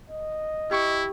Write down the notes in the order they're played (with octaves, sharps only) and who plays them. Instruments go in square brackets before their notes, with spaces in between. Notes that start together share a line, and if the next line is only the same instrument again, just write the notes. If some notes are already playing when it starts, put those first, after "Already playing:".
[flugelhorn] D#5
[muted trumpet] E4 [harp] G4 C#6